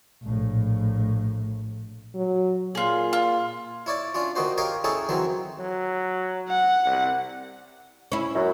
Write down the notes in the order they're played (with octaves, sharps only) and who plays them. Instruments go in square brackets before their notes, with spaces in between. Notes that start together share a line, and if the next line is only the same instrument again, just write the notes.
[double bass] A#1 A2
[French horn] F#3
[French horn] A#2 [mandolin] F4 G#4
[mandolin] F4
[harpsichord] E4 C#5 D5
C#4 D4 F4
D#3 A#3 D#4 F#4 C5
G4 A#4 C#5 D#5 F5 G5
C#4 D#4 E4 G#4 A4 C#5
D#3 E3 F#3 C4
[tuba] F#3
[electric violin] F#5
[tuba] C2
[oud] C#4 E4
[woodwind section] F#2